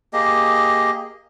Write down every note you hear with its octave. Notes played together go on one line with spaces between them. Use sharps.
A#3 G4 G#4 D#5